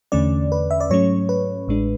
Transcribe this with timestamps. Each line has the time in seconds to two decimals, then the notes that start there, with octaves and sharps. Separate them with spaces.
0.12 E2 D3 A3 C#4 D5
0.52 B4
0.71 E5
0.80 D5
0.90 G#2 F#3 A3 C#4 C#5
1.29 B4
1.68 A1 A2 G#3 D4